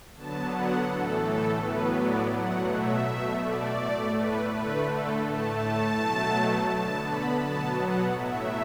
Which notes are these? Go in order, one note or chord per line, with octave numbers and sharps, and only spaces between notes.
D3 F#3 B3 A5
F#5
A2 E3 A3 A4
A4
A2 F#3 B3 B4
D5
B2 F#3 A3 F#5
E5
B2 A3
D5
A2 A3
B4
D3 A3 B4
A4
A2 A3 A5
A5
B2 F#3 A3
D3 B3 A5
B5
B2 F#3 B3 A5
F#5
A2 F#3 A3 E5